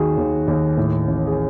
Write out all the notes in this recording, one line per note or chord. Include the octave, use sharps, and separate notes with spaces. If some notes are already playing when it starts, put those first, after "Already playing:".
Already playing: D#2 D#3 F#4 G#4
D#2
D#2
A2
A1
G#4